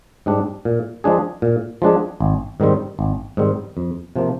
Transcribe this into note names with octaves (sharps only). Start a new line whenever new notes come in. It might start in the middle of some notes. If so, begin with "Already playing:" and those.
G#2 G3 D4
A#2
F3 G#3 D4 G#4
A#2
F3 G#3 D4 G#4
G#1
G#2 D#3 G3 C4
G#1
G#2 D#3 G3 C4
F2
C3 F3 A#3